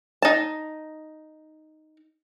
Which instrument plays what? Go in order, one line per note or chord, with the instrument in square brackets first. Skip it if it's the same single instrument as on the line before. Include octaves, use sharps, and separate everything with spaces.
[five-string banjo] D#4 A5